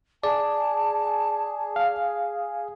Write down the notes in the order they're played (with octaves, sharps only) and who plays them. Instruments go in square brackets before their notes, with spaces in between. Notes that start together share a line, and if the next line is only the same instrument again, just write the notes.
[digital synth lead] G#4 [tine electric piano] D5 [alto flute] A5
[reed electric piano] F5